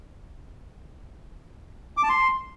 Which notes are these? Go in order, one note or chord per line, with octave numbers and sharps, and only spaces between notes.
D6
A5
C6